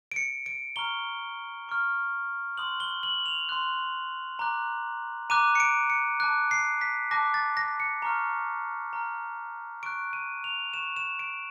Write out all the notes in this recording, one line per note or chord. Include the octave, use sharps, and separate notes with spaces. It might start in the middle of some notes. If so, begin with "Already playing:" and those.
D7
C#7
D7
A#5 C#6 F6 G7
A#5 C#6 F6
C6 D#6 F#6 F#7
G7
F#7
F7
C6 D#6 F#6
A#5 D6 F#6
A#5 D6 F#6 D#7
C#7
D7
C#7
A5 D6 F#6
C7
B6
A5 D6 F#6 A#6
A6
A#6
C#7
A#5 C#6 F6
A#5 C#6 F6
C#6 F#6 D7
D#7
F7
C#6 F#6 E7
E7
D7